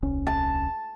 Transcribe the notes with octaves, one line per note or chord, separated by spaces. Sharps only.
D#1 C2 C#4
A5